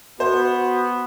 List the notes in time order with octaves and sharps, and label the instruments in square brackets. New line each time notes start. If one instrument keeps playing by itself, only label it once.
[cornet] B3 [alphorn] F#4 [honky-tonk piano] C5